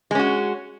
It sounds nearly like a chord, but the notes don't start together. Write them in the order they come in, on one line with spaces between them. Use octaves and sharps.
G#3 C#4 F#4